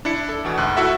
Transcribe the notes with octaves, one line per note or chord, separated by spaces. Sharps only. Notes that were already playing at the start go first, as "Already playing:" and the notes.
D4 E4 C#7
A4
E2 B2
D2 G#2 F#6
E4 F#4 A4 E5 F#5